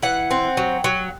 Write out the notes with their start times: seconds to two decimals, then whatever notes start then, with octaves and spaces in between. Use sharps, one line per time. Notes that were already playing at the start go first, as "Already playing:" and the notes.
0.03 E3 F#5
0.31 C4
0.57 F#3
0.84 F#3